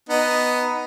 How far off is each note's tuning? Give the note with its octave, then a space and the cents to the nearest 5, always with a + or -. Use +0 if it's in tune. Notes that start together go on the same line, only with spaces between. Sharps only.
B3 +5 D#4 +0